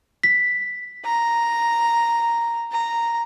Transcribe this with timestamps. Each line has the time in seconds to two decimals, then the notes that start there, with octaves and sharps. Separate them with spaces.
0.23 B6
1.05 A#5
2.72 A#5